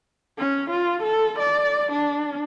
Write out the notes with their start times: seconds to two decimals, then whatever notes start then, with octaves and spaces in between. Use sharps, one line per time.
0.38 C#4
0.70 F4
1.03 A4
1.39 D5
1.92 D4